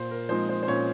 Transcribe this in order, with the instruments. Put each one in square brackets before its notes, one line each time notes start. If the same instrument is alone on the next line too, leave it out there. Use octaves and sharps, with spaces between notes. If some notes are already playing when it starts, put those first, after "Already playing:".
Already playing: [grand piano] A#2 C5
A#4
F3 G#3 C4 D#4 C5
C5
C5
A#2 C#4 C#5